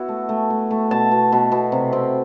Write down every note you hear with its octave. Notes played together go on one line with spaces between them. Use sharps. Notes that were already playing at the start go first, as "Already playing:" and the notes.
Already playing: B3 E4 F#4
A3
A3
A3
A3
B2 A5
B2
B2
B2
C3
C4